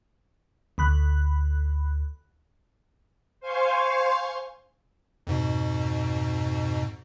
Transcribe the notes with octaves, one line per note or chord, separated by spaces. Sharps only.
D2 B5 F#6
C5 F5 G#5 C6 C#6
F2 G#2 B2